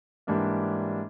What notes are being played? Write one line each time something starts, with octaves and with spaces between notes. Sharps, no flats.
G#2 E3 G3 A#3 D4